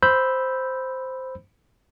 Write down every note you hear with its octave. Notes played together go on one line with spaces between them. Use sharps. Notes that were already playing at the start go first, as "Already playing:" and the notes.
C5 B5 E6 G6